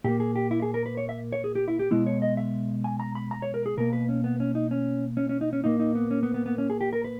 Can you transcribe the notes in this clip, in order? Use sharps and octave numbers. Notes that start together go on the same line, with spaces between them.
A#2 A#3 G4
G#4
G4
E4
G#4
A#4
B4
C#5
E5
C#5
G#4
G4
E4
G4
B2 G#3 B3 E4
C#5
D#5
E5
G#5
A#5
B5
A#5
C#5
A#4
G#4
B2 A#3 A#4
B4
C#4
B3
C#4
D#4
C#4
C#4
C#4
D#4
C#4
A#2 A#3 D#4
D#4
B3
C#4
B3
B3
B3
C#4
G#4
G4
A#4
B4